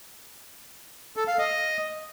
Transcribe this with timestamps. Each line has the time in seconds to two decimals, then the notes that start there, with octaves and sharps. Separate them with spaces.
1.16 A4
1.28 F5
1.39 D#5